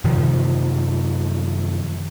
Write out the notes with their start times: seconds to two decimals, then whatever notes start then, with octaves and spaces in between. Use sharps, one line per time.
0.04 F#2 C3 D#3 F3